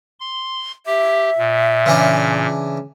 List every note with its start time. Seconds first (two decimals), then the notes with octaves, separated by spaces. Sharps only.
0.20 C6
0.86 G4 E5
1.38 A#2
1.86 C#3 E3 D4